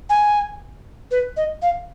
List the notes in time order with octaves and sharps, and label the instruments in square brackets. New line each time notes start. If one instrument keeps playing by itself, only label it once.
[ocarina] G#5
B4
D#5
F5